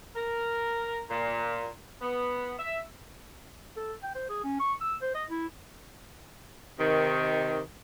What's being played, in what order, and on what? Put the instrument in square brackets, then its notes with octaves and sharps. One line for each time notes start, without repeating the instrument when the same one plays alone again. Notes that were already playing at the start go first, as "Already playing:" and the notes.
[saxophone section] A#4
A#2
B3
E5
[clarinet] A4
G5
C5
G#4
C#4
C#6
E6
C5
D#5
E4
[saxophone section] C3 D#3